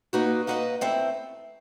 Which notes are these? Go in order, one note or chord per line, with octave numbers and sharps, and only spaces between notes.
A#3 D#4 F#4 B4 D#5
A#3 D#4 F#4 B4 D#5
A3 C4 E4